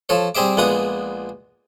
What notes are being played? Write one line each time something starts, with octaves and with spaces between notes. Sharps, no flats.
F3 A4 C#5
G3 C4 G#4 E5 D6
A#1 A#2 G#3 B3 F#5 D#6